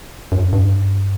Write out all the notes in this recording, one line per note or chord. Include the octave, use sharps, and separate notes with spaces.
F#2
G2